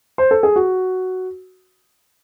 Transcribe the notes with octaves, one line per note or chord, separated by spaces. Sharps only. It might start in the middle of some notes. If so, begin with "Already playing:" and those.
C5
A4
G#4
F#4